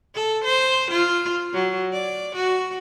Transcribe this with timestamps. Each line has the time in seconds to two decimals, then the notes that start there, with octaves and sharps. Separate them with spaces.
0.15 A4
0.44 C5
0.91 F4
1.54 F#3
1.92 D5
2.36 F#4